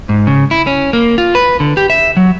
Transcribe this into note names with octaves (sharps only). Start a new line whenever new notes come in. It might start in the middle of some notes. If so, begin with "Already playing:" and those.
G#2
C#3
E4
C#4
A#3
F4
B4
D3
G4
E5
F#3